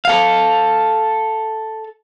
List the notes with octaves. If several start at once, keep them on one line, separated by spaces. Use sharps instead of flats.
A4 F5